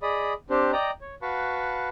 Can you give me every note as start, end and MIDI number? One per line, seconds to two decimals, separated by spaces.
0.02 0.33 68
0.02 0.33 74
0.02 0.33 75
0.02 0.33 83
0.02 0.33 87
0.50 0.71 60
0.50 0.71 62
0.50 0.71 67
0.50 0.71 72
0.73 0.91 74
0.73 0.91 75
0.73 0.91 79
0.73 0.91 82
1.01 1.15 73
1.22 1.89 66
1.22 1.89 71
1.22 1.89 77
1.22 1.89 81
1.22 1.89 83
1.22 1.89 85